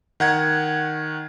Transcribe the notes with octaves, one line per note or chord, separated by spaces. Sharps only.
D#3 F#5 G#6